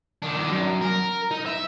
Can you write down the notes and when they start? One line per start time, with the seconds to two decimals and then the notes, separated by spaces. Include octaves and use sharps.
0.22 D#3 D4
0.51 F#2
0.81 A#4
1.31 D#4
1.46 E5